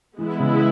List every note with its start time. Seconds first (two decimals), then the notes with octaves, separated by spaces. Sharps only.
0.18 E3 G#3 B3 E4
0.40 C#3